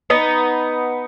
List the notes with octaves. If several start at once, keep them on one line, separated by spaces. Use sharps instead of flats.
B3 D#4